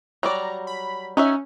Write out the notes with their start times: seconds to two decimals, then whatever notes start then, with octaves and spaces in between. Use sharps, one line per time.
0.23 F#3 G3 D5 A#5
0.67 B5
1.17 C#4 D#4 F#4 E5